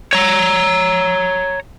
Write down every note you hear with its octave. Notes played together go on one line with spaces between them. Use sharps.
C#5 A#5